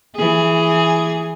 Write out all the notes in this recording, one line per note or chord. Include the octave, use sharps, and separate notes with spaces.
E3 G#4